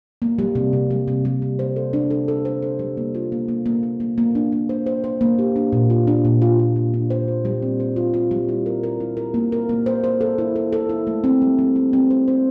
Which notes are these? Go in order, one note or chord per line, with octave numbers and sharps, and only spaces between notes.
A#3
G3
C3
C3
G3
C3
G3
C3
C5
A4
D4
A4
A4
C5
A4
G3
A#3
F4
A#3
A#3
A#3
A#3
A#3
A#3
D4
A#3
C5
C5
C5
A#3
G4
D4
A#2
F4
D4
A#2
F4
F4
A#2
D4
C5
F4
G3
C4
C5
F4
F4
G3
E4
A#4
A#4
E4
A#4
A#3
A#4
A#3
C5
C5
A4
E4
A4
A4
E4
A3
C4
G3
G3
G3
C4
C5
C5